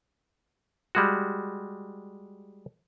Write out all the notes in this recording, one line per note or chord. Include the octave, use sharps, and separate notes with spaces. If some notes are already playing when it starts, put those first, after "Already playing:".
G3 G#3 F#4